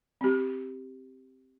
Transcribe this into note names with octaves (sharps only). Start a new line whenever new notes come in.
C4 G4